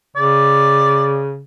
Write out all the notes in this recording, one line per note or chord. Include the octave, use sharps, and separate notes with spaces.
C#3 D5